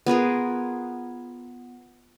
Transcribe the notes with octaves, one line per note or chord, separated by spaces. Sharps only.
B3 F4 G#4 A#4